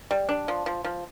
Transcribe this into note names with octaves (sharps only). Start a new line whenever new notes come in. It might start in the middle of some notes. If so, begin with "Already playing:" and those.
G3
D4
F3
F3
F3